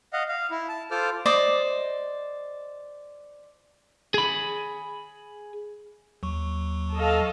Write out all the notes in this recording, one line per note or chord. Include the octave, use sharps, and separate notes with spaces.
D#5 F5 F#5
F5
E4
A5
F4 A4 C5 D6 F6
C5 D5 D#5
G#4 B5
D#2 F#3 C#6
A4 D#5 F5